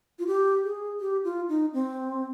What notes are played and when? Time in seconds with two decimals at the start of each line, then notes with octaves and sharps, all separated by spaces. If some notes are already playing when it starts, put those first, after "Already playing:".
0.19 F4
0.27 G4
0.64 G#4
1.00 G4
1.24 F4
1.49 D#4
1.73 C4